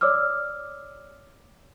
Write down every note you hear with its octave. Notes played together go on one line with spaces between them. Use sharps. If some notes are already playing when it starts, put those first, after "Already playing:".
C#5 D5 D6 E6 F6